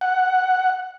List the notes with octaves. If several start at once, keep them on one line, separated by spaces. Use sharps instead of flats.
F#5